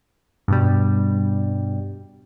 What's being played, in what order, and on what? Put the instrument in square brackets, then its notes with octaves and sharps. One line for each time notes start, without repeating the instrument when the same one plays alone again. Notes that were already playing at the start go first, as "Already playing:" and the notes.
[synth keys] G2 B2 G3